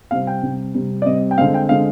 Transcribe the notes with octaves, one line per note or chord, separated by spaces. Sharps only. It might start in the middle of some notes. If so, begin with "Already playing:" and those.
C3 G3 C4 F5
G5
C3 G3 C4
C3 G3 C4
D5
C3 G3 C4 D#5
G5
D3 G#3 C4 F5
G5
D3 G#3 C4 F5